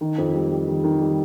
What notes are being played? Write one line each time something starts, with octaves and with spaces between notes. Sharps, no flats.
D#3
F2
G3
G3
D#3
D#3
G3